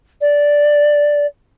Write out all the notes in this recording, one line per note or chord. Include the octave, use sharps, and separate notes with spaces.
D5